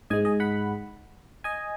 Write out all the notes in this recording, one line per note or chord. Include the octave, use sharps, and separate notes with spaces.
G#2 G#3 D#5 G#5
D#5 G#5
F#5 B5
D#5 G#5